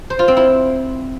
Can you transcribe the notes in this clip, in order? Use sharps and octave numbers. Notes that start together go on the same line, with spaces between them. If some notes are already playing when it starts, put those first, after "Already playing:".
C5
F4
C4
E4